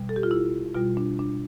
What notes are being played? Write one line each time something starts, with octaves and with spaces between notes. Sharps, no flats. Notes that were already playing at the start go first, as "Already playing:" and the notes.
Already playing: B2 G3
A4
G4
F4
E4
B2 G3 F4
D4
D4